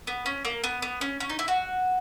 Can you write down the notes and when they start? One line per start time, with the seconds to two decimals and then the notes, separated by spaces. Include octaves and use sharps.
0.07 B3
0.26 C#4
0.45 A#3
0.64 B3
0.82 B3
1.01 C#4
1.20 C#4
1.30 D#4
1.39 E4
1.48 F#4